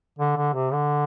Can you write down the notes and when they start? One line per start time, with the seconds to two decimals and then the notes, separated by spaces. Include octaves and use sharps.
0.19 D3
0.37 D3
0.54 C3
0.73 D3